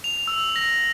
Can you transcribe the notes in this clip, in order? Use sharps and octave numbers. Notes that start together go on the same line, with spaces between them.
F7
E6
A#6